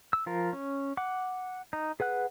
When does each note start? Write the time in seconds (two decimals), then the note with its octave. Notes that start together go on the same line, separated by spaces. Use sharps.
0.13 E6
0.26 F3 F4 A#4
0.53 C#4
0.97 F#5 D6
1.73 D#4
2.00 G#4 B4 F#5 F#6